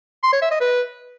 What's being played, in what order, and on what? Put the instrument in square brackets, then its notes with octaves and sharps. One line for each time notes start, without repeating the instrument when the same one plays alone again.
[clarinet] C6
C#5
E5
D#5
B4